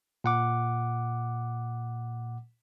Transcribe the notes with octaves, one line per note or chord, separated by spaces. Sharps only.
A#2 F#5 D6